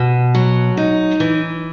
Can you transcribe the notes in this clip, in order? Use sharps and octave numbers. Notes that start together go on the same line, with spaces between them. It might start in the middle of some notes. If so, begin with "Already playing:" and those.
Already playing: B2
F#3
D#4
E3